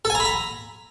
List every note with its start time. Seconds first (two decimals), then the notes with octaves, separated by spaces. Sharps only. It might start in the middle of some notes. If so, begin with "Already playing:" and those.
0.05 A4
0.10 G#5
0.15 A#5
0.20 B5
0.25 A#5